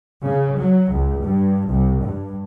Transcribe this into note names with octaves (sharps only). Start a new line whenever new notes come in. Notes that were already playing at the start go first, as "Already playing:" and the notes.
C#3
F#3
C#2
G2
C2
G2